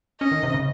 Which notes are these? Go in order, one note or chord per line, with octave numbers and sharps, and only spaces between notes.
C#4 D#5
D#3
C3
C#3